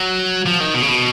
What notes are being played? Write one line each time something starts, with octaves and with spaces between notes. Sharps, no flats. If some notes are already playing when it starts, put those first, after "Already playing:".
Already playing: F#3
F3
D#3
B2
C#3
B2